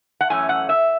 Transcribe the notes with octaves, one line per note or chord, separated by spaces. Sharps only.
F#5
F#2 E3 A3 C#4 G#5
F#5
E5